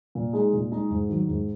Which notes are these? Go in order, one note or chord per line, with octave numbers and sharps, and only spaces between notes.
A#2
G#3 D#4 G#4
A#2
G#3 D#4 G#4
G#2
D#3 F#3
G#2